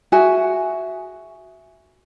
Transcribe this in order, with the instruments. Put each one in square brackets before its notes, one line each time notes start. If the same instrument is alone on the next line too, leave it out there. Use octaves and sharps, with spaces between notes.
[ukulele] F#4 G#4 E5 G#5